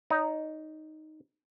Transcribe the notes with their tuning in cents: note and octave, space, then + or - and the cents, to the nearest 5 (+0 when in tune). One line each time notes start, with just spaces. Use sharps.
D#4 +0 C#5 +45